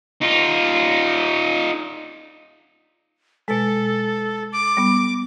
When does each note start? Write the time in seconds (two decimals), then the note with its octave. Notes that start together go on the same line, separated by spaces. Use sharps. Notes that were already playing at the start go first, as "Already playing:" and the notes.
0.21 D#4 F4
3.48 B2 G#3 A4
4.53 D6
4.77 G3 B3